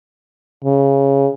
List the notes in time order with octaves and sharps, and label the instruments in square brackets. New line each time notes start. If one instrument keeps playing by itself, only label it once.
[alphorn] C#3